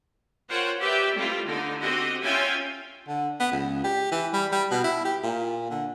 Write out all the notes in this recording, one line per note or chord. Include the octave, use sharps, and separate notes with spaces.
F4 A#4 C5 C#5 F#5 G5
G4 B4 D5 E5 G5
G3 A3 C4 E4 F4
D3 D#4
C4 F#4 G4 D#5
C#4 F4 E5 G5 G#5
D3
B3
C#2
G4
E3
G3
G3
B2
E4
G4
A#2
D3